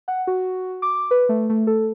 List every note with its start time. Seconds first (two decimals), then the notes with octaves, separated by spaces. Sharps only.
0.08 F#5
0.27 F#4
0.82 D6
1.11 B4
1.29 A3
1.50 A3
1.67 A4